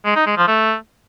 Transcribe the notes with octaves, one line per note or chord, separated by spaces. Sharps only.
G#3
D#4
G#3
F3
A3